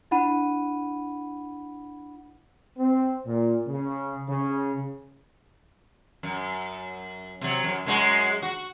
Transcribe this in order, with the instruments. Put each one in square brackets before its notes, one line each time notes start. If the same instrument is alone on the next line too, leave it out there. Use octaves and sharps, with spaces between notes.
[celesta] D4 E4 F#5 B5 D#7
[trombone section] C4
A#2
C#3
C#3
[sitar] F#2
C3 F#3
F#2
F#2 G#3 F#4
F#4